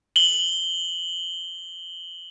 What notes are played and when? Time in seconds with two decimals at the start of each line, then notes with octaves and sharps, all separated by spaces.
0.16 F#7 G7